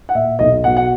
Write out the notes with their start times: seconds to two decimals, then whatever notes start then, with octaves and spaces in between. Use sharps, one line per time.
0.09 F#5
0.15 A#2 E5
0.39 B1 D#5
0.64 B2 F#5
0.77 F#5